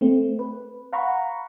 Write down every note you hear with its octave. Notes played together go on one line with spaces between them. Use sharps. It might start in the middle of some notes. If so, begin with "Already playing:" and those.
A3 C4
B4
F5 F#5 A#5 B5 C#6